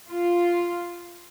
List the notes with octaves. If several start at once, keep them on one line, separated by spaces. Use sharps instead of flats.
F4